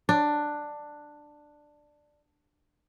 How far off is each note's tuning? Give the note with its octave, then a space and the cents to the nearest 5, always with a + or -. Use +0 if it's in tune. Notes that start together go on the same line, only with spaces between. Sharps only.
D4 +10